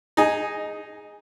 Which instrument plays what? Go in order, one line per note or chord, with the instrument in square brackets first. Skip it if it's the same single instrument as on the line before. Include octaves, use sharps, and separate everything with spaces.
[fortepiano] D#4 G#4